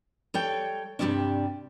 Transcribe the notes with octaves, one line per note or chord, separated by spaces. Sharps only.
G3 A4 C#5 G5
G2 C3 G3 G#3 C#4 D4